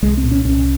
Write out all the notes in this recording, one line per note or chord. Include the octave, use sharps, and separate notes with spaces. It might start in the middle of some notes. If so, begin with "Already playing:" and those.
C2 G#3
C4
A#2
C#4
C2 C#4